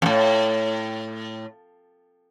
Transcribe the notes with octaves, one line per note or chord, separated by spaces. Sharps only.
F2 A2